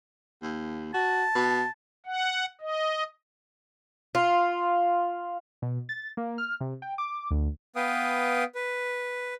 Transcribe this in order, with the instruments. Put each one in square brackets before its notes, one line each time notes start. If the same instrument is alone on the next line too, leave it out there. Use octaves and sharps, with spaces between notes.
[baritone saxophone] D#2
[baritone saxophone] F#4 [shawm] A5
[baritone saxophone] B2
[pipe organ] F#5
D#5
[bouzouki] F4
[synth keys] B2
A6
A#3
F6
C3
G5
D6
D2
[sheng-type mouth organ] B3 B4 F5 G5 D#6
B4